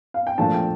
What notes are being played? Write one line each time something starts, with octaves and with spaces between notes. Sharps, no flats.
F5
G5
A#2 F3 A3 D4 F4 A5
G5